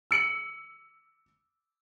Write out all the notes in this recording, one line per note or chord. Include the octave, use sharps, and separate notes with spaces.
E6 C#7 F#7